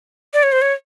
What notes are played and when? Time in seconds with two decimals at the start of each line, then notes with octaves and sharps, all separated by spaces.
0.34 D5
0.43 C#5
0.52 C5
0.62 C#5